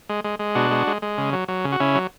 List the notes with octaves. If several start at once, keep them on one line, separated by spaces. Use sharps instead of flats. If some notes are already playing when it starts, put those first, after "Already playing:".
G#3
G#3
G#3
B2 D4 F#4
G#3
G#3
G#3
C#3
F#3
F#3
C#3
F#4
C#3 C#4 E4
F#3